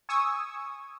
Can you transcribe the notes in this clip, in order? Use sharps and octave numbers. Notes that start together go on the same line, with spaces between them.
G#5 C#6 D#6 E6